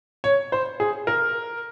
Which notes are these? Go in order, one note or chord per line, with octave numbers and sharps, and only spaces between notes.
C#5
C5
G#4
A#4